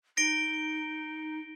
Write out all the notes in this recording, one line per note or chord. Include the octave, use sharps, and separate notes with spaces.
D#4 A#6 D7 G7